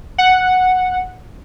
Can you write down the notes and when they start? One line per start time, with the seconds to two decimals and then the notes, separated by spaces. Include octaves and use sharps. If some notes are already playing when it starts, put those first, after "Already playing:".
0.18 F#5